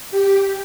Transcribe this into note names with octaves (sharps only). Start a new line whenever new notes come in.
G4